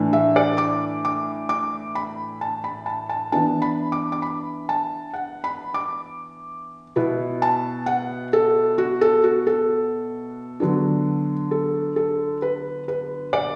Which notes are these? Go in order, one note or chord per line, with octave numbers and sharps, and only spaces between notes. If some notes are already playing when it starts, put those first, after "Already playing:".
Already playing: A2 E3 D4
E5
D5
D6
D6
D6
B5
A5
B5
A5
A5
E3 B3 D4 A5
B5
D6
D6
B5
A5
F#5
B5
D6
B2 B3 E4
A5
F#5
A4
F#4
A4
F#4
A4
D3 F#3 B3 D4
A4
A4
B4
B4
D5